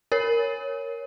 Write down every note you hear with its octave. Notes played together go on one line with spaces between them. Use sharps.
A#4 C#5